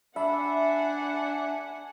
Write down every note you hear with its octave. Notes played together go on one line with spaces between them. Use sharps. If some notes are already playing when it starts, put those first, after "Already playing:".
D4 E5 F#5 G#5 B5